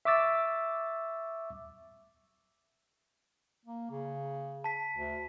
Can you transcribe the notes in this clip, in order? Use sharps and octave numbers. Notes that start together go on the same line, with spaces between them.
E5 C#6 D6 E6 A6
A#3
C#3
A5 B6
D2